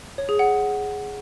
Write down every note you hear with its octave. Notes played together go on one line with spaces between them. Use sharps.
C#5
G#4
F#5